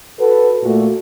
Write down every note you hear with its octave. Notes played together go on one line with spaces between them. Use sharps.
F#4 A4 B4
A#2 A3 F#4